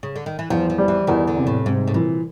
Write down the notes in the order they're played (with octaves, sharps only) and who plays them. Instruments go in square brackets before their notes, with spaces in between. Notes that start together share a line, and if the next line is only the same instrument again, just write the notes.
[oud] C#3
D3
D#3
E3
[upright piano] E2 [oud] F3
[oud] F3
[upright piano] G3
[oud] E3
[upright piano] E2 [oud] D#3
[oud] D3
[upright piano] C3
[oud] A2
[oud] G#2 [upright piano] C3
[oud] A2
[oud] A#2 [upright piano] E3